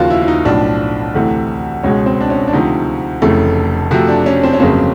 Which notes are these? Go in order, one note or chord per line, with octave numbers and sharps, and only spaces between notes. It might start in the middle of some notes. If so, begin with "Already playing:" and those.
Already playing: D#2 C#3 F3 A#3 F4 F#4
E4
E4
D#4
B1 A2 F3 D4
D2 C3 E3 A3
C#2 B2 G#3 C#4
C4
D4
C#4
D4
D2 C3 F3 D#4
F1 F2 C#3 E3 A3
F2 C3 F3 A3 F#4
D4
C#4
C4
C#4
G1 F2 C#3 F#3 A#3 C4